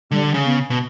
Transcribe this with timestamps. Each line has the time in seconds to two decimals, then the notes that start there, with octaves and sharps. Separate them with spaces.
0.11 D3 G3
0.34 C#3
0.45 B3
0.70 B2